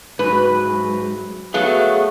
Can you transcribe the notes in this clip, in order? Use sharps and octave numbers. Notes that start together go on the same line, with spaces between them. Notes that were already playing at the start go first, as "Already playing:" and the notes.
G#2 F#3 B4
F#3 A3 B3 G#4 F5